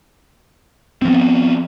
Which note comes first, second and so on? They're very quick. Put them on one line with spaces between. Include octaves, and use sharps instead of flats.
C4 F3 B3